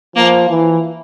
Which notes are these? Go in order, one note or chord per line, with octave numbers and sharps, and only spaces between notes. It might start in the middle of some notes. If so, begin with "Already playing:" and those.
F3 A#3
E3